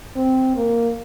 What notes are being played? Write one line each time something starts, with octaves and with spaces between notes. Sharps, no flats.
C4
A#3